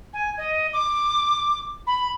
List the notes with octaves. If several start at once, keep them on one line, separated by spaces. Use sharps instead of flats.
G#5
D#5
D6
B5